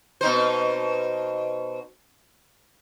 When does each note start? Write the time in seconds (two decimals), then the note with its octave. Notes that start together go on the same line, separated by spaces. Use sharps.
0.21 B2 D#4 C5